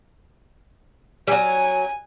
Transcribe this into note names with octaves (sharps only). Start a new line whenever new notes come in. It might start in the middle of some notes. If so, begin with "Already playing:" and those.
F#3 G3 G#5